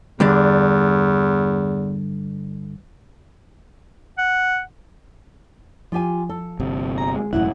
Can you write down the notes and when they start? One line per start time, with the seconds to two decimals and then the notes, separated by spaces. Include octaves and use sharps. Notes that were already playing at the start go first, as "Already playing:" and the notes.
0.20 E2 G2 D3 D4
4.18 F#5
5.92 F3 F4 G4 G#5
6.29 A4
6.59 G1 C3
6.98 G#4 A#5
7.16 G#3
7.33 E1 F#2 A2 E4 F#5